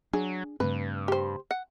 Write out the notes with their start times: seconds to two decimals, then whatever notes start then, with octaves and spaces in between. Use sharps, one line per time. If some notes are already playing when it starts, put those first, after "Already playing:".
0.13 F#3 D4 G#4
0.60 G2 C#3 A3 C4 B4
1.08 G4 C5
1.51 F#5